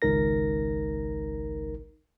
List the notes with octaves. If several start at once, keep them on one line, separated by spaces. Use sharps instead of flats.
G#1 C#2 D#4 A#4 A#6